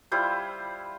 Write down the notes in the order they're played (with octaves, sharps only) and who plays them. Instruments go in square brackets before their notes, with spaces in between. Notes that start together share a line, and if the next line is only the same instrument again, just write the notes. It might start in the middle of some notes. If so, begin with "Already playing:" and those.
[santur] G3 E4 F4 C5